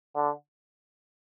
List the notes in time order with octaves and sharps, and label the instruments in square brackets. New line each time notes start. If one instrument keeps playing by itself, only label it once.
[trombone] D3